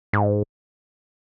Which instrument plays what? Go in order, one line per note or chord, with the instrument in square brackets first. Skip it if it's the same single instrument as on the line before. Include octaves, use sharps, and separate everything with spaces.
[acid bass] G#2